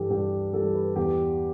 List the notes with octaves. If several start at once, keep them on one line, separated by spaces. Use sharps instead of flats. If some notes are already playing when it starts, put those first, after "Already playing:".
Already playing: G2 E3 G3 G4 A4
G2 G4
E3 G3 A4
B4
E2 G4